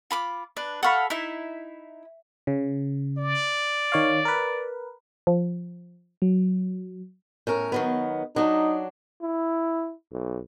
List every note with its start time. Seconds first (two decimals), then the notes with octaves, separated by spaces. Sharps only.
0.11 F4 B5 D6
0.57 D4 B4
0.83 A4 F5 F#5 B5 C#6
1.10 D#4 E4 E5
2.47 C#3
3.18 D5
3.92 D#3 C#5 F5
4.25 A#4 B4
5.27 F3
6.22 F#3
7.47 A2 C#4 A#4
7.72 D#3 F#3 B3
8.36 F#3 D4 D#4
9.21 E4
10.12 B1